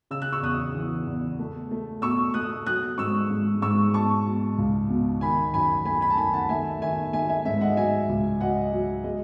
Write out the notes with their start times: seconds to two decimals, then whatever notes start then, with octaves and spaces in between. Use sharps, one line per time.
0.11 C#3 E6
0.22 F#6
0.33 C#6 E6
0.42 E2 D#6 F#6
0.75 E3
1.07 E2
1.39 A3
1.71 A3
2.02 B2 C#6 E6
2.34 A3 D#6 F#6
2.66 F#3 D#6 F#6
2.98 G#2 C#6 E6
3.30 G#2
3.62 G#2 C#6 E6
3.94 B2 A5 C#6
4.27 B2
4.58 C#2
4.90 B2
5.21 D#3 G#5 B5
5.54 F#2 G#5 B5
5.85 A3 G#5 B5
6.01 G#5 B5
6.10 A5
6.17 D#3 G#5 B5
6.33 F#5 A5
6.49 A3 E5 G#5
6.82 D#3 E5 G#5
7.13 A3 E5 G#5
7.29 E5 G#5
7.45 G#2 E5
7.61 D#5 F#5
7.76 F#3 E5 G#5
8.09 C#2
8.41 F#3 D#5 F#5
8.73 F#3
9.04 G#3 D#5